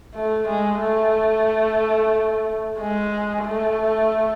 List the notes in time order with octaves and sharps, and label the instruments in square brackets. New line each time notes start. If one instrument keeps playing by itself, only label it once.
[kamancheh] A3
G#3
A3
G#3
A3